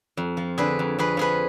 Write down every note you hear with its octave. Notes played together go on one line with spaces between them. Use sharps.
F2
F3
D3 G#4 B4
F2
F2 G#4 B4
F3 G#4 B4